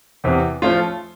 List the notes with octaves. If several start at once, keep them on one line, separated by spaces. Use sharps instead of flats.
E2 C3 E3
F3 A3 C#4 F4